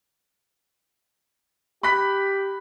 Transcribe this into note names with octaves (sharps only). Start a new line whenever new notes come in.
G4 B5 F#6 B6